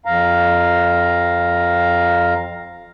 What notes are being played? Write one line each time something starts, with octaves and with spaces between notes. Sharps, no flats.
F2 F5 A#5